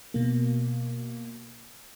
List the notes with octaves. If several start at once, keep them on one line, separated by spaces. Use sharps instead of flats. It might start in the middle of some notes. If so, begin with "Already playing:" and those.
B2 A#3